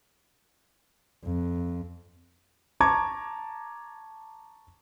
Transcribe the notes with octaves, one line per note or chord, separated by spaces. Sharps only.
F2
A5 A#5 C#6 D6 G#6